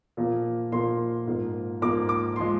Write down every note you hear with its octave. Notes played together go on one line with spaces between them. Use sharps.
A#2 F3 A#3
A#2 F3 A#3 C6
G#2 F3 A#3
G#2 F3 A#3 D6
D6
F3 G#3 C6